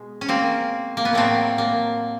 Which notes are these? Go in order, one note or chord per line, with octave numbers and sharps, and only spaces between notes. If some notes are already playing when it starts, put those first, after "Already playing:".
Already playing: B2 G#3
C#4
A#3 C4
A#3
B3
A2 F#3 A3 A#3 C4
A#3